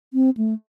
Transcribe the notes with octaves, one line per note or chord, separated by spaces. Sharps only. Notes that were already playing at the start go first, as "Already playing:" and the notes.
C4
A3